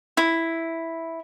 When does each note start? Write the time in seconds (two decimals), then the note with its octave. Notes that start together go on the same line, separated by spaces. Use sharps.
0.17 E4